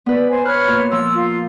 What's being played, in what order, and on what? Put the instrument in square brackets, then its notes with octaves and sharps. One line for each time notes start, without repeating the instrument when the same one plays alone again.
[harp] B3 B4 [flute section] D5
[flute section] C5 G#5
[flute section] B4 C#5 F6 [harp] F#6
[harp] A#2
[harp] F3 [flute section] E6
[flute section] F4